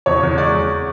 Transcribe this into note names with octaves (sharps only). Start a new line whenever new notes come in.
E2 C#5
E2
G#3 D5
E2